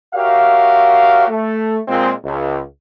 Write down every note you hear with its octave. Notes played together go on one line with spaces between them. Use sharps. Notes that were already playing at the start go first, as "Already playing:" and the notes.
F#4 G4 A#4 C#5 E5 F5
A3
A#2 G#3 C4
C#2